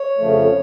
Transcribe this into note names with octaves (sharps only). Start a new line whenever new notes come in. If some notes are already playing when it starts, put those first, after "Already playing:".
Already playing: C#5
F2 C#3 F3 A3